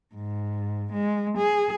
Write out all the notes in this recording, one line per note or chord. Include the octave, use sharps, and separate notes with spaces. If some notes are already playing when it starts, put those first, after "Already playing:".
G#2
G#3
G#4